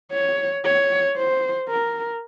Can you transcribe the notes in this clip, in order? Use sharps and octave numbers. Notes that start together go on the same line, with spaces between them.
C#5
C#5
C5
A#4